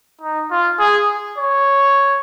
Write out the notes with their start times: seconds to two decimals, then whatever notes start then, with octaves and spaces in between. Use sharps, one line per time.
0.21 D#4
0.51 F4
0.79 G#4
1.38 C#5